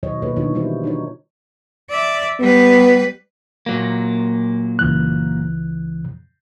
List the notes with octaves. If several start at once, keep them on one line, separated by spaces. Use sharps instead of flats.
B2 D#3 F#3 C5 C#5 D#5
B2 A#3 A4 B4 C#5
B2 D3 D#3 D4 F4 C#5
D3 E3 G3 E4 C5
D4 D#4 C#5
D5 E5
G3 B3 B4
A#2 F#3 A#3
C#2 E3 F#6